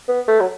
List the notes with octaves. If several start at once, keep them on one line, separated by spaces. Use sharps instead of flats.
B3
A3
F#3